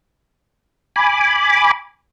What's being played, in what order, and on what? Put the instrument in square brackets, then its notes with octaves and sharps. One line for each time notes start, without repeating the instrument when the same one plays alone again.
[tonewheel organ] G#5 B5 D6